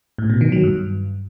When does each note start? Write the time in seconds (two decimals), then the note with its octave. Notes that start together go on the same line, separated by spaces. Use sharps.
0.18 A2
0.30 B2
0.41 D#3
0.52 F#3
0.63 G2